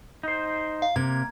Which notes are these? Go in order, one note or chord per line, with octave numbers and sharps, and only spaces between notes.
D#4 C5
F5
C3 A#3 G#6